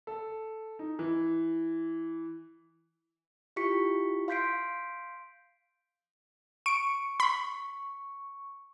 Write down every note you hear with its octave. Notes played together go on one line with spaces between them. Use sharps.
A4
D#4
E3
E4 F4 G4 C#6 B6 C#7
F5 C6 G6 B6 C7 D7
C#6 D7
B5